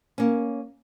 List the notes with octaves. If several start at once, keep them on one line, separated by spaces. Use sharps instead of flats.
A#3 C#4